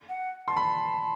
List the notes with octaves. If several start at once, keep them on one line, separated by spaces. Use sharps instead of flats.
F#5
A5 C6
B5